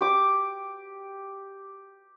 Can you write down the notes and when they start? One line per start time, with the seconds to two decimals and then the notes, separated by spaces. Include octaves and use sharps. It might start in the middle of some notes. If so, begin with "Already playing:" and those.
0.01 G4 D6